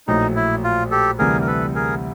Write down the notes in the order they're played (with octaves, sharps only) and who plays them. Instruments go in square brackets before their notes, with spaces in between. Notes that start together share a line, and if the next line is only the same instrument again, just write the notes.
[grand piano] A#1 A2 F#3 [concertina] D#4
[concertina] E4
F4
G4 A4
[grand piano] D2 C3 E3 G3 [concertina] G#4 A#4
[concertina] A#4
A4 B4
G#4 A#4